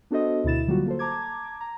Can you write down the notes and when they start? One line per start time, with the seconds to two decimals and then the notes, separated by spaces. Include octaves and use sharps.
0.11 B3 D4 F#4 A4 C5 D#5
0.44 D2 B2 E4 A6 E7
0.67 D3 F#3 G3 A#3 F4 F#4
0.86 A#3 A4 C5
0.99 A5 A#5 D6 G#6
1.60 A#5